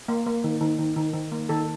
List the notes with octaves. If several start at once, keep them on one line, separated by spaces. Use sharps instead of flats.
A#3
A#3
D#3
D#3
D#3
D#3
D#3
A#3
D#3 A4